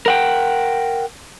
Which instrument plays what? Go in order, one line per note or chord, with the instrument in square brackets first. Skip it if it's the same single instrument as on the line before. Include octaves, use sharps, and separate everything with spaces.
[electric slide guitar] A#4 F#5 G5